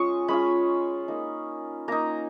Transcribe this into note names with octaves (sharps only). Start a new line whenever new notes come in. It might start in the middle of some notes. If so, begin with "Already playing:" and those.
Already playing: G#3 C#4 F4 C#6 D#6
G#3 C#4 F4 B5
A#3 D#4
A#3 D#4 A#5